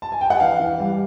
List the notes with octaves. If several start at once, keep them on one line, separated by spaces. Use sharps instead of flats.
A5
G#5
G5
F#5
E3 F5
E3
G3